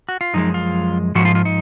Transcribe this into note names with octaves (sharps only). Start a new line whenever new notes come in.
F#4
F4
F#2 F3 G#3 D#4
F4
G#2 F3 F#4
F4
F4
D#4